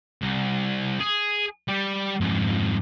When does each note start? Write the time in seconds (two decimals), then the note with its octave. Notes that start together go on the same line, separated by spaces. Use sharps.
0.21 C2
1.00 G#4
1.69 G3 G4
2.21 F2 G#2